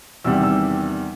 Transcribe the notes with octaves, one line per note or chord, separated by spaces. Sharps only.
E2 C3 D#3 G3 E6
E6